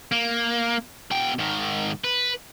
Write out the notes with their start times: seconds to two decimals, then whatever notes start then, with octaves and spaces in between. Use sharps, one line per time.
0.12 A#3
1.11 B2 G5
1.39 G#2 D#3
2.04 B4